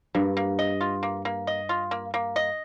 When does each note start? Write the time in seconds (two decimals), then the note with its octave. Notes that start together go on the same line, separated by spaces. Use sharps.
0.15 G2 A#3
0.37 A#3
0.59 D#5
0.81 F4
1.03 A#3
1.25 A#3
1.47 D#5
1.69 F4
1.91 A#3
2.14 A#3
2.36 D#5